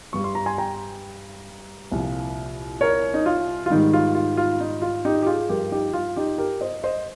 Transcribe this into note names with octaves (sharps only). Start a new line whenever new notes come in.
G2 G3 C#6
C6
A#5
G#5 C6
G5 A#5
C2 A#2 F3
A#4 C#5
D#4
F4
F4
G#2 D#3 G3 D#4
F4
F4
F4
D#4
F4
D#4 G4
G4
F4 G#4
G2 F3 G4 A#4
D#4 G4
F4
D#4 G4
G4 A#4
C5 D#5
C5 D#5